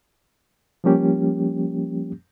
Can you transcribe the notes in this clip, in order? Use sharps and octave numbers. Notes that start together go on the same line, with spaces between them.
F3 G3 A#3 C#4 G4